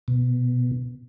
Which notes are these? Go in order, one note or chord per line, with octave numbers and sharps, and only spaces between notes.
B2